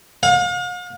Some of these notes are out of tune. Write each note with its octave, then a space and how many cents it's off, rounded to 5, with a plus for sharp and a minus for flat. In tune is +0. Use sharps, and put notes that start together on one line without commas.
F5 +45